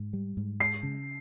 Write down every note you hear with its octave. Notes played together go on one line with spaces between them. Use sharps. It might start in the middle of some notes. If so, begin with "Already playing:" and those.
Already playing: G#2
G3
G#2
G#3 C7
C#3